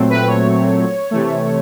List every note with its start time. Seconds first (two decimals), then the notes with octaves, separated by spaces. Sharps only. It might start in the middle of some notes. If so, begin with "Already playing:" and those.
Already playing: A#2 F#3 A3 C4
0.10 B4
0.27 C#5
1.11 C3 E3 A3